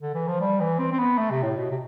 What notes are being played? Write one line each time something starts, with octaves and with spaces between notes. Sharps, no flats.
D3
E3
F3
G3
E3
C4
C4
B3
A3
C3
A2
B2
C3